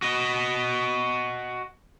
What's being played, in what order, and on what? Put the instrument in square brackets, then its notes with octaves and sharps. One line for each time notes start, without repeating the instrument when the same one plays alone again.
[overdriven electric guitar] F#4 D#5